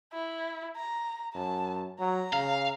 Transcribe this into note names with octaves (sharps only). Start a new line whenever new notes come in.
E4
A#5
F#2 A5
F#3 A#5
C#3 F5